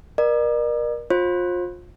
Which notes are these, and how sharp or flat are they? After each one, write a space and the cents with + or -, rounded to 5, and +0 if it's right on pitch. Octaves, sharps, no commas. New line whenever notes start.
A#4 +30 D5 +40
F4 +30 C5 +35